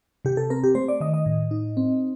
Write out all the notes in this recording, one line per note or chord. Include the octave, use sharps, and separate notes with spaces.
C3 G4
A4
C4 A#4
G4
A3 C5
D5
D#3 D#5
D#5
A2
D#4
C4